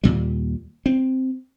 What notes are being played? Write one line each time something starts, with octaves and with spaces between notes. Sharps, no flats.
D#2 A#2 G3
C4